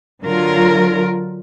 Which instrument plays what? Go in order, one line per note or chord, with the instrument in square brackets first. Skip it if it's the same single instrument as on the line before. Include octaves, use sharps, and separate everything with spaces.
[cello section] D3 F#3 F4 A#4